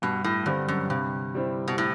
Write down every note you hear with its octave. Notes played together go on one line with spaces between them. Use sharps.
G2 B2
A2
G2 D3 G3 C4
F#2
G2 C3
G3 C4 E4
B2
A2